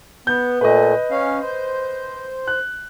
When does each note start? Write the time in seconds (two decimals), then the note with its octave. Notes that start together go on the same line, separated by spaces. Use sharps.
0.27 B3 G6
0.61 A#2 A3 B4 D#5
1.11 C#4 F5
1.42 C5
2.47 F#6